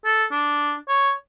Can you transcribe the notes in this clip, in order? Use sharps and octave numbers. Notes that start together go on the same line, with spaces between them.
A4
D4
C#5